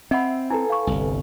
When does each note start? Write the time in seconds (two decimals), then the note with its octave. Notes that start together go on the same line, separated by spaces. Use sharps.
0.11 C4 D#5 E5 F#5 B5
0.50 E4 A4 B4 G#5
0.70 F5 C#6
0.87 G1 C2